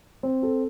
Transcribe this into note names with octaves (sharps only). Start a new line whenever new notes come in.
C4
A4